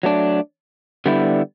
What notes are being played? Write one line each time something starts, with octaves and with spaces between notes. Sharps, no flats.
F#3 A3 D4
D3 G3 B3 E4